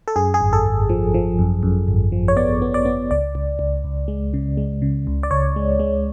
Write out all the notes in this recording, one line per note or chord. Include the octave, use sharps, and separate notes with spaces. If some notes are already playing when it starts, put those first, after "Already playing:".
A4
F#2 G#4
G#4
G#1
A4
G#1
F3
F3
F#2
F#2
G#1
F3
C#5
B3 D5
B3
D5
B3
C#2 D5
C#2
C#2
C#2
G#3
C#3
G#3
C#3
C#2
D5
C#2 C#5
G#3
G#3